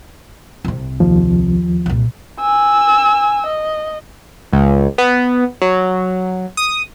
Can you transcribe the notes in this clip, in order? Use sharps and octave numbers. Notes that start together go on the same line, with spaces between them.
C2 C3
D#2 F3
C2 A#2
G#5 E6
D#5
C#2
B3
F#3
D#6